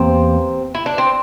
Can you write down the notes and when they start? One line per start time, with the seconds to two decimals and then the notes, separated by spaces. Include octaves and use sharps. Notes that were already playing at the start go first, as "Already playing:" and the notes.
Already playing: E2 C3 E3 A#3 C4
0.74 E4
0.86 D4
0.98 C4